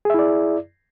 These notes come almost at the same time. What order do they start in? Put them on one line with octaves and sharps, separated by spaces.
G#4 E5 E4 D5